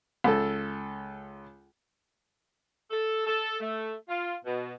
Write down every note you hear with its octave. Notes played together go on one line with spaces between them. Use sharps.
C#2 A4
A4
A4
A3
F4
B2